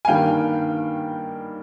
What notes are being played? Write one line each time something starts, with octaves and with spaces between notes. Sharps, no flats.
G#5
G2 D#3 G3 A#3 F5 G5